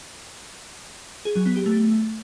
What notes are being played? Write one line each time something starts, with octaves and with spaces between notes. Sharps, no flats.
G#4
F#3
B3
G4
A3